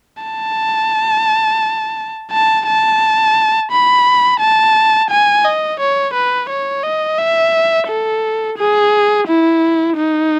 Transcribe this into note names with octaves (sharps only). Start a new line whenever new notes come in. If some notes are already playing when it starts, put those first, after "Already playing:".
A5
A5
A5
B5
A5
G#5
D#5
C#5
B4
C#5
D#5
E5
A4
G#4
E4
D#4